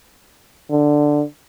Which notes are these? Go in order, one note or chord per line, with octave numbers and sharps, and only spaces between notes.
D3